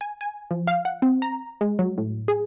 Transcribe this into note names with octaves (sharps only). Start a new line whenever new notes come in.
G#5
G#5
F3
F5
F#5
C4
A#5
G#3
F#3
A2
G#4